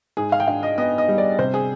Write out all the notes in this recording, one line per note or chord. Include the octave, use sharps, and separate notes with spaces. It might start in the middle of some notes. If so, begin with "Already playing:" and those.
G#2 G#4
F5
G5
D4 F5
D#5
B3 D#5
D#5
G3
D5
C3 C5
G#4